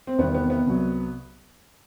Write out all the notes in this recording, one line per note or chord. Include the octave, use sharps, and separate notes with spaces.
C4
E2 C3 D#3 G3 B3
B3
B3
C2 C3 F#3